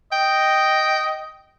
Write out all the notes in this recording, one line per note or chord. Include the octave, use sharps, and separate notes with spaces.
D#5 G5